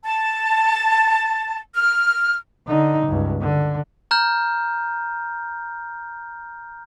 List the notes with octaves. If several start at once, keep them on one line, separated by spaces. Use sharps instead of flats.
A5
F6
D3 D#4
C#2 G2
D3
A#5 F6 G6